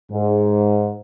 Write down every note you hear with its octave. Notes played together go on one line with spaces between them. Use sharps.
G#2